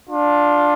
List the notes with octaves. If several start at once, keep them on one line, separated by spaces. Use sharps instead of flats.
D4 F4